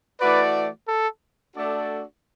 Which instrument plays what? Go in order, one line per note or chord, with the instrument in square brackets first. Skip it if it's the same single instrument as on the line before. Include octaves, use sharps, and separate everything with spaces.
[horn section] E3 A3 F#4 D5 [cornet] B4
[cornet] A4
[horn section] A3 D4 F#4 A4 D5